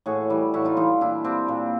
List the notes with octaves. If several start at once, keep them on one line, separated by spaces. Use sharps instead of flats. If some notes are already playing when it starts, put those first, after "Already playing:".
A2 F#4 G#4
E3 G3
A2 E4 F#4
D#4 F4
E3 G3 D#4 F4
A#2 D4 E4
G3 C4 D4
A#2